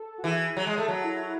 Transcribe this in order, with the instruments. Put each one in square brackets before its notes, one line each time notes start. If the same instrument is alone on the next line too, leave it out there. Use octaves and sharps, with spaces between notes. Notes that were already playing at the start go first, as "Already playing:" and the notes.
Already playing: [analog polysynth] A4
F#4
[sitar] E3 [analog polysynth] G#4
[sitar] F#3
G#3
A3
[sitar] F#3 [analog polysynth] F#4
[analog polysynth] E4
E4